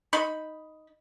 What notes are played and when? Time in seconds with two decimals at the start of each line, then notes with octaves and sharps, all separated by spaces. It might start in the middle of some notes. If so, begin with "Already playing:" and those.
0.13 D#4 B5